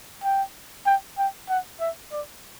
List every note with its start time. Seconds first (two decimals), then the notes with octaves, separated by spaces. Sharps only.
0.24 G5
0.86 G5
1.18 G5
1.49 F#5
1.80 E5
2.12 D5